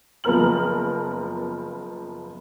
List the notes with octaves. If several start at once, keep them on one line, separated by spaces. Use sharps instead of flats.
F#1 F3 B3 A#4 F6 F#7